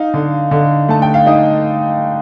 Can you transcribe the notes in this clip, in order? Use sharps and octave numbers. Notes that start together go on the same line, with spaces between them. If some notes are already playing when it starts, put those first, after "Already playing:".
Already playing: D#4 F5
D3
D3
A3 A5
G5
F5
D#4 D#5